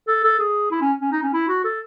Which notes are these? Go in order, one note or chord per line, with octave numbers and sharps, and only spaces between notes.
A4
A4
G#4
E4
C#4
C#4
D#4
C#4
E4
F#4
A4